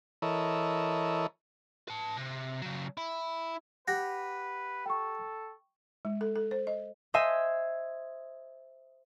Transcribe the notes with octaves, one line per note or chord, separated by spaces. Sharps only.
E3 E4 A4 A#4 C#5 D#5
B4 A5
C3
C#3 F#3
E4
G4 B4 F#5 A#6
A4 G5 C#6
G#3
A4
A4
C5
D#5
C5 D#5 E5 G#5